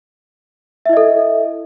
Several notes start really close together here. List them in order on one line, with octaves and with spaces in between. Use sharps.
E5 E4 D#5 A4